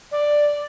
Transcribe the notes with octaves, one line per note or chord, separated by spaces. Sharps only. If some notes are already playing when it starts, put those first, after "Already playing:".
D5